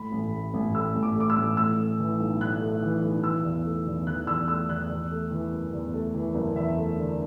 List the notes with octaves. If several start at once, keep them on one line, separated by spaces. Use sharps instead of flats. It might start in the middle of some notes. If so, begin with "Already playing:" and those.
Already playing: A2 B5
A1
A3
A1
A2 E6
A1
D6
A3 D6
E6
A1
A2 E6
A3
E3
B1
A2 F#6
A3
E3
B1
E3 E6
E2
A3
E2
E3 F#6
E2 E6
A3 E6
E2 F#6
E2
A3
E3
F#1
E2
A3
E3
F#1
E2 E5
A3
D3